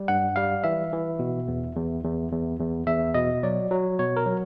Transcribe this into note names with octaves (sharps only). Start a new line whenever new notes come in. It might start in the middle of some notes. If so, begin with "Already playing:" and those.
Already playing: G3
G2 F#5
G3 F5
E3 E5
E3
B2
E2
E2
E2
E2
E2
E2 E5
B2 D#5
F#3 D5
F#3
B2 C#5
A#4
F#3